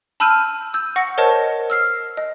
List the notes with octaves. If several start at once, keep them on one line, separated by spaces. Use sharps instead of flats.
A5 B5 E6 F6 G6 D#7
E6 G6
F#5 C#6 A#6 C#7
A#4 C5 C#5 D#5 A5
E6 F6 C7
D#5